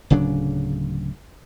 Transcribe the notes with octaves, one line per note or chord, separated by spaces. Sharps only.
D1 C#3 F#3 D4